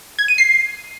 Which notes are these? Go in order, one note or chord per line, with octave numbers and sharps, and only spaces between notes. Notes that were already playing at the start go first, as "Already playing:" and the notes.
G#6
D#7
C7